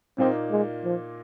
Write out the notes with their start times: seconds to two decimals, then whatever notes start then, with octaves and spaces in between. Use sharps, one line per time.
0.18 A#2 A#3 C4 D#4
0.51 G#3
0.84 F3